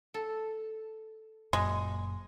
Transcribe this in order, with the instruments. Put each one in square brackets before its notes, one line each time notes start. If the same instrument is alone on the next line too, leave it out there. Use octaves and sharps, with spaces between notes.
[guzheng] A4
[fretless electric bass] F#1 F#2 A#2 [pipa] G#3